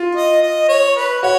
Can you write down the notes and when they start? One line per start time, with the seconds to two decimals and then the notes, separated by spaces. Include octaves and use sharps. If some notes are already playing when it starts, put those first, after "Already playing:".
Already playing: F4
0.15 D#5
0.42 D#5
0.69 C#5
0.96 B4
1.23 F#4 C#5